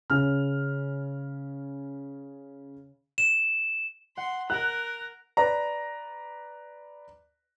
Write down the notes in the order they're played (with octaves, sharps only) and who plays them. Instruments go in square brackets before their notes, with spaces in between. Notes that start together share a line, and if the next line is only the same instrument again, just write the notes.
[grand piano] C#3 C#4 F6
[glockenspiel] E7
[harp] F#5 [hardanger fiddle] C6
[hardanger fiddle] A#4 [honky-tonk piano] F#6
[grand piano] B4 D5 A#5